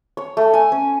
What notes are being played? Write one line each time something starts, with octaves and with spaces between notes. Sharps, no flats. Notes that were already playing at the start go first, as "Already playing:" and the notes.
C#5
A3
G#5
C#4